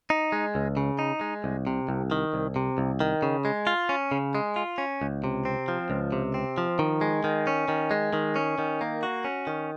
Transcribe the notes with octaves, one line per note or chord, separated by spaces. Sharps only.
D#4
G#3
C#2
C#3
D#4
G#3
C2
C3
C2
D#3
C2
C3
C2
D#3
C#3
G#3
F4
C#4
C#3
G#3
F4
C#4
C#2
C3
C4
F3
C#2
C3
C4
F3
D#3
G#3
D#3
C#4
D#3
G#3
D#3
C#4
D#3
A#3
F#4
C#4
D#3